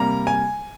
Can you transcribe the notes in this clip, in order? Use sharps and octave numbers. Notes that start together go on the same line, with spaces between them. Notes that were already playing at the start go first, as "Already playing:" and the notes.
Already playing: C3 G3 A#3 A#5
G#5